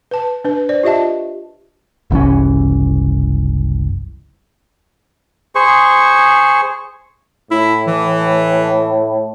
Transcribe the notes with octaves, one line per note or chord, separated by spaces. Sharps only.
B4 A5
D4 B4
C5 D5
F4 G4 D#5 E5 A5
F#1 C2 E3 C#4
G#4 C5 C#6
A2 E4
E3